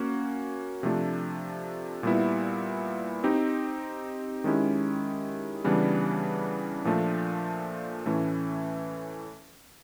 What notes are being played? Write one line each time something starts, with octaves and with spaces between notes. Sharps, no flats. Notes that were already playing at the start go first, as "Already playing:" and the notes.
Already playing: A#3 C#4 F#4
C3 F3 A3 D4
A#2 G3 B3 E4
C4 D#4 G4
D#3 G#3 C#4 E4 G4
C#3 E3 G3 B3 D4
A#2 F3 A3 D4
A2 E3 A3 C#4